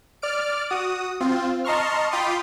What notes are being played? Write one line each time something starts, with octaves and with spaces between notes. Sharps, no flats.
D5 F6 D7
F#4 D#6
C4 F4
D#5 A5 A#5 C6 C#6 F6
F4 G5 B5 C6 D6 D#6